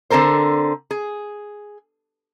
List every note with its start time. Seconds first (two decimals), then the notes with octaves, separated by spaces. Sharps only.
0.10 D3 C4 A4 A#4 C5
0.91 G#4